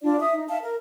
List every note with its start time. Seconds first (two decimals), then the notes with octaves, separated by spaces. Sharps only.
0.02 D4 F4 D5
0.20 E5 D#6
0.34 D#4
0.49 E5 F5 A5
0.62 A#4